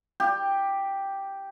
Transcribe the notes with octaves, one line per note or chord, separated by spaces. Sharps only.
G4